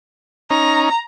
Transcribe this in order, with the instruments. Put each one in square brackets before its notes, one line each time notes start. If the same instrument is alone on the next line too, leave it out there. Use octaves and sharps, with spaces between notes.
[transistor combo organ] C#4 D#4 [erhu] A#5